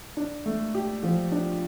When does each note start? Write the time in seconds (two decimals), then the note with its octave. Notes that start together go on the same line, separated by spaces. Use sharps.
0.17 D4
0.46 A3
0.75 G4
1.03 F3
1.32 D4